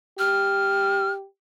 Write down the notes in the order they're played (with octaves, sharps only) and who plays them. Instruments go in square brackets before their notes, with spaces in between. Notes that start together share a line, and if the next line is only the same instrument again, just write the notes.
[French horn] G4 [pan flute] F6